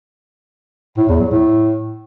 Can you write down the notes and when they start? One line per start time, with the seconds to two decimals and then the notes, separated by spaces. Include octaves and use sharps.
0.97 A2
1.09 E2
1.20 F#3
1.31 A2